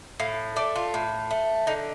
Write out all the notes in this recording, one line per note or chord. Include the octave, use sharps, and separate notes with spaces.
A2 F5
A3 D5
F4
A2
A3
D3 D#4